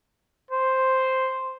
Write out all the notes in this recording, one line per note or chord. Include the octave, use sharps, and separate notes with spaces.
C5